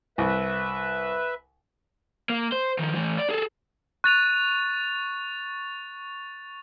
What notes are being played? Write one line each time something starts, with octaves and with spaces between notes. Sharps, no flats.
C2 B4 E5
A#3
C5
D#3 F3
E3 A3
D5
G#4 A4
C#6 F#6 A6 D#7 F7